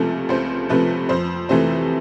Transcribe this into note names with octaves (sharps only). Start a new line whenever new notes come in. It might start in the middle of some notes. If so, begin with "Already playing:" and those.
Already playing: C#2 C3 F3 A3
C#2 C5
C3 F3 A3 B4
F2 C5
C3 E3 A3 C5